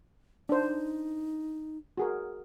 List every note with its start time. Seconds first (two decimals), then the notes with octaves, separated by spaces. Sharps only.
0.49 D4 D#4 C5
1.97 F#4 G#4 A#4